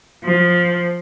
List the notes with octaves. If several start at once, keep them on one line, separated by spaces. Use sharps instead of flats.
F3